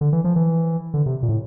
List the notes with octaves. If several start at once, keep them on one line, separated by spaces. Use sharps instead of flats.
D3
E3
F3
E3
D3
C3
A#2
A2